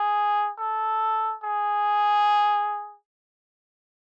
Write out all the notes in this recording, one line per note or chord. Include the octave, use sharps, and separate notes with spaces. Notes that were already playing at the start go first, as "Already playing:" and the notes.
Already playing: G#4
A4
G#4